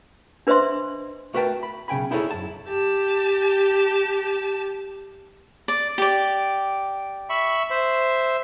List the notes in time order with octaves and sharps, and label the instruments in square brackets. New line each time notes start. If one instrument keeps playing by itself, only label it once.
[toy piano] D4 B4 C5 D#5 E5 C6
[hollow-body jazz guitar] A3 F#4 A#4 B4 G5 A5
B5
B1 C#3 G5 G#5 B5
D#4 E4 G#4 A4 C#5
F#2 A5
[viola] G4 A5
[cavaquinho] D5
G4 D5
[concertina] E5 B5 C#6
C5 E5